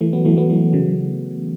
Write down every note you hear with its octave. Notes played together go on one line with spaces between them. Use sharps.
E3 A3
F#3 B3
E3 A3
F#3 B3
E3 A3
C#3 F#3